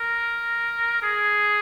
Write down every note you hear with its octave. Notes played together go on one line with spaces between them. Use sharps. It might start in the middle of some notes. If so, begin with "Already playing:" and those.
Already playing: A#4
G#4